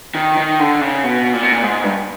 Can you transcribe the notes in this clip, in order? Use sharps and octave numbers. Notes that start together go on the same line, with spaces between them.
D#3
D#3
D3
C#3
B2
A#2
B2
A#2
G#2
G2